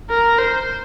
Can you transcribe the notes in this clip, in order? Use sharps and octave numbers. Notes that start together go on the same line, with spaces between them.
A#4
C5